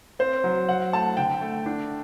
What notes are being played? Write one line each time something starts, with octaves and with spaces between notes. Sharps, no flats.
C4 C5
F#3
F#3 F#5
A3 A5
D3 G5
A3
D4